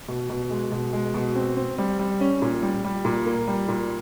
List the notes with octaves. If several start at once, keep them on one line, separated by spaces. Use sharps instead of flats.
B2
B2
G#3
B2
G#3
B2
C4
C4
G3
G3
C#4
A#2
G3
G3
A#2
A#3
G3
A#2